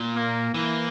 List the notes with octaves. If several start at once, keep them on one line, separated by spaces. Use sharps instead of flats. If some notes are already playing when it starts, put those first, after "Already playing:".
Already playing: A#2
A#3
E3 A#3